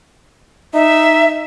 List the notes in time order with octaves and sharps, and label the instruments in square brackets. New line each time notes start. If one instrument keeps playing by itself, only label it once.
[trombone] D#4 [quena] E5